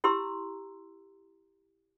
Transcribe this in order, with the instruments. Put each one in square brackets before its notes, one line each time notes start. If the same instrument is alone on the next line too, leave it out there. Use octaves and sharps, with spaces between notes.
[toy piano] E4 G4 A#5 C6 E6